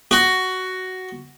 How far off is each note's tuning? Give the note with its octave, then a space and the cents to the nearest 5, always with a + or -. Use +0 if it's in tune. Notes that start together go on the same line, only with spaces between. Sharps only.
F#4 +10